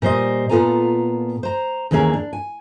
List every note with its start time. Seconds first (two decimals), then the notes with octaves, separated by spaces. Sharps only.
0.02 A#2 G3 C5 D#5
0.49 A#2 B3 F4 A4 G#5 A#5
1.43 C5 A#5
1.91 D#2 E3 A#3 C#4 G#4 A#4
2.13 D4
2.33 G#5